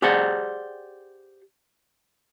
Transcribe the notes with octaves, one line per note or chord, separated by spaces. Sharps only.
G4 G#4 C5 D5 F#5